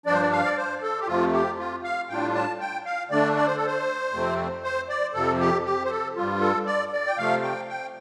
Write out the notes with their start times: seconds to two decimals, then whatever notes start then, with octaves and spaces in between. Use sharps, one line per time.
0.06 G2 F3 D4 D5
0.14 C5
0.22 D5
0.32 F5
0.45 D5
0.57 C5
0.82 A4
1.00 G4
1.07 F2 C3 F3 A3 F4
1.33 G4
1.58 F4
1.84 F5
2.09 A2 G3 D4 F4 G5
2.34 A5
2.60 G5
2.86 F5
3.11 D3 A3 D4 D5
3.36 D5
3.46 C5
3.56 A4
3.66 C5
4.13 F2 C3 A3 C4
4.63 C5
4.89 D5
5.14 F2 C3 F3 A4
5.40 G4
5.65 G4
5.85 C5
5.90 A4
6.16 G2 G3 F4
6.41 A4
6.66 D5
6.93 D5
7.07 G5
7.18 C3 F3 A3 F5
7.43 G5
7.69 G5